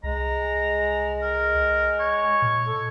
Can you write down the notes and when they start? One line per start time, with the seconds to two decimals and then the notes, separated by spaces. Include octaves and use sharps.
0.04 C2 G#3 A#5
1.22 A#4
2.00 C#5
2.42 A#2
2.67 A4